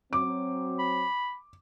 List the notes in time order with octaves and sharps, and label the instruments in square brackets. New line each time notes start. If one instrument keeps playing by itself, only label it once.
[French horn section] F#3 C4 [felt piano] D6
[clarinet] B5